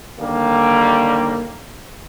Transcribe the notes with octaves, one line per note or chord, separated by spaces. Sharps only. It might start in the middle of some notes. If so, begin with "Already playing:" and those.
D#2 D3 G3 A#3